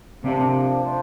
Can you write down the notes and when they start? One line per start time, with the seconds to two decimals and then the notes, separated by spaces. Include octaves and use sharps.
0.23 C3 F3 A#3 D4
0.83 A3 D4 F4 C5